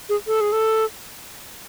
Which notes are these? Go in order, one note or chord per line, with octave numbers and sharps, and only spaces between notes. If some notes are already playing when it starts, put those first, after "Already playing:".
G#4
A4
G#4
A4